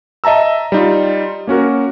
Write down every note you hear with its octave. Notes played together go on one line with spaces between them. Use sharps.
D#5 E5 A5 A#5 E6
G3 D#4 F4
A#3 C#4 F#4 A#4